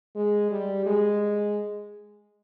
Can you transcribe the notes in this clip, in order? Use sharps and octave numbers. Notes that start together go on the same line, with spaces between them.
G#3
G3
G#3